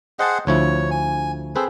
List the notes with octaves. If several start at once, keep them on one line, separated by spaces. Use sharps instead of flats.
G#4 C5 D#5 F#5 G5 A5
D2 F3 E4 C#5
G#5
C4 G#4 A4 B4 C5